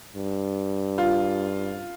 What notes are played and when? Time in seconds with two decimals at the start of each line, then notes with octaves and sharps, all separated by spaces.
0.16 G2
0.98 F4